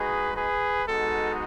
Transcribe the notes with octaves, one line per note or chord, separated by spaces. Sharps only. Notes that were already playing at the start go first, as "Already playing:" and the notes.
Already playing: G#3 D#4 F#4 G#4 B4
G#4 B4
G#3 B3 D#4 F#4 A4